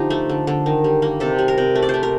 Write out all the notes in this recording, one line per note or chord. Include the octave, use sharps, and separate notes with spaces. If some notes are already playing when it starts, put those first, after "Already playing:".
Already playing: D3 F3 D#4 G4
A3
D3
D3
D#3
G3
A#3
C3 A4
G3
A#4
C3
A3
D5
A3 C5
A#4